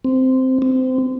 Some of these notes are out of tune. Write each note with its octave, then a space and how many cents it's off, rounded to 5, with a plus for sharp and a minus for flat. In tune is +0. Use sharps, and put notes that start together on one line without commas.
C4 -10
C4 -25